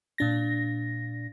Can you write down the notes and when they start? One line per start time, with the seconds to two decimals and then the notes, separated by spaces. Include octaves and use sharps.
0.18 A#2 D4 A#6